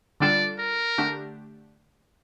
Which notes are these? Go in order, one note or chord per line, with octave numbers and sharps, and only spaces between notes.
D3 G3 D4 F4 A4 D5
A#4
D3 A3 D4 G4